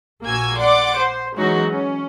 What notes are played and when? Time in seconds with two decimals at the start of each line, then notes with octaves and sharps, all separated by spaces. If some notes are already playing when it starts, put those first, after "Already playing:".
0.24 A#1 A#3 F#4 G#5 E6 G#6
0.58 D5 F#5 C6 D6
0.98 C5
1.37 E3 F#3 G#3 C#4 D#4 F#4
1.66 C#4